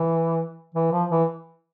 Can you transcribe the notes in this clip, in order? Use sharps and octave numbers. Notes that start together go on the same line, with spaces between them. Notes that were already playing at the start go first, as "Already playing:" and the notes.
Already playing: E3
E3
F3
E3